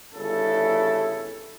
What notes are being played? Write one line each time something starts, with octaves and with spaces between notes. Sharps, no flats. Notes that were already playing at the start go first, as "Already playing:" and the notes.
G1 C#3 E4 A4